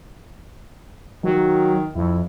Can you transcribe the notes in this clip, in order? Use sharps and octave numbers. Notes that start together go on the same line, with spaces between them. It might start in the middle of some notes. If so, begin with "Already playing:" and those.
D#3 F#3
F2 E4